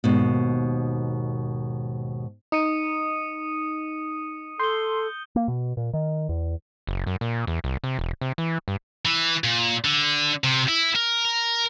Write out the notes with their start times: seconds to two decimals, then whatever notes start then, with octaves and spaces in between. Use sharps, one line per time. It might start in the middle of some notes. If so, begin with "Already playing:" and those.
0.04 D#2 G#2 B2
2.52 D#4 D#6 C#7 D#7
4.60 A4 C6 G6 G7
5.36 A#3
5.48 B2
5.77 A#2
5.93 D#3
6.29 E2
6.87 F#1
7.07 F#2
7.21 A#2
7.47 E2
7.64 C2
7.84 C3
7.99 E1
8.21 C3
8.38 E3
8.68 G2
9.06 E3
9.44 A#2
9.85 D3
10.44 C3
10.68 E4
10.95 A#4